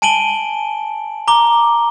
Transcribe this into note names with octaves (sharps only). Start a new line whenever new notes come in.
G#5 A5 D7 D#7 F#7 G7
A#5 D6 G7